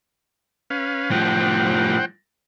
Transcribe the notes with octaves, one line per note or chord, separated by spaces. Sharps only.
C#4 B4 F5
A2 F3 C5 F#5 G5